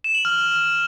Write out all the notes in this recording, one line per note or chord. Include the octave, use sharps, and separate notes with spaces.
E7
F#7
F6